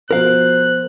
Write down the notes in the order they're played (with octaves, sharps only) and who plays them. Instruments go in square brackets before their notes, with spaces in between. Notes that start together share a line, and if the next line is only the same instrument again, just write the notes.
[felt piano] B2 F3 [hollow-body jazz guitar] A#4 F5 [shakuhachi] C5 [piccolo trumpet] F#6